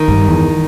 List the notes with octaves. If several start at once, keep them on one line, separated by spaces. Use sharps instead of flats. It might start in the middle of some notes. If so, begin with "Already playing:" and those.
Already playing: D#3
G2
E2